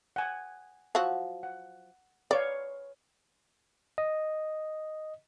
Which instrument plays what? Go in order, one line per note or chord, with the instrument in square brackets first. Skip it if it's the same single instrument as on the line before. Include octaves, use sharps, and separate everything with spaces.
[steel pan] F#5 G#5
[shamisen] F3 F#3 F#4
[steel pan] F#5
[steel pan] B4 C#5 F5 [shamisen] D5
[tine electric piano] D#5